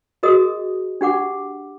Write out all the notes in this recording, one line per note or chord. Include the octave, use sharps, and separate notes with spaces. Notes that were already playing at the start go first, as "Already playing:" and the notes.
F#4 G#4 A#4 D#5 D#6
D4 G4 F#5 D6